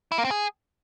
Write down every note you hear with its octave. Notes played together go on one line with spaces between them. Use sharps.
E4
A#3
C4
G#4